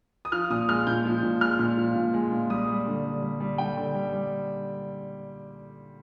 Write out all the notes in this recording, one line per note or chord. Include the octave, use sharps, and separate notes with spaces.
D#6
F3 F6
A#2 D#6
G#3 F6
A#2 G6
F3
A#2
G#3 F6
A#2
F3
A#2
G#3
A#2
G3 D#6
G3
D3
D3
G3
G3
D3 G5
D3
G3
G3